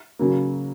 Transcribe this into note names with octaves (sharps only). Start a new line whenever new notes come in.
C#3 F#3 A#3